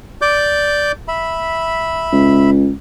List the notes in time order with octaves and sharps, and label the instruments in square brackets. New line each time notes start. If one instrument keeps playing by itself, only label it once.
[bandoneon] D5 D6 G6
E5 B5
[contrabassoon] C#2